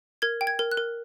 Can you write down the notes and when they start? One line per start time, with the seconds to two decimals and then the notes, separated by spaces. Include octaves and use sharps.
0.22 A#4 G#6
0.41 G5
0.47 G#6
0.59 A#4
0.71 F#6
0.77 A#4